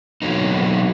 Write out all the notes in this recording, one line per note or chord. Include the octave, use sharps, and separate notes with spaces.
B2 D3 F#3 A#3 D#4